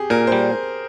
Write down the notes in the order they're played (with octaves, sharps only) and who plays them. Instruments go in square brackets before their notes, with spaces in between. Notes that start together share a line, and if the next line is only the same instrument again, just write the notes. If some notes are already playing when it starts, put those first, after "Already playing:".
Already playing: [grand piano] G4 G#4
[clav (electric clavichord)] A#2 [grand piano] A#4
[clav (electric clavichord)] G3 [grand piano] C5